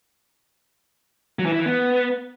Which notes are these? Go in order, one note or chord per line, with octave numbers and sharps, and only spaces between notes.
F#3
E3
E4
E3
B3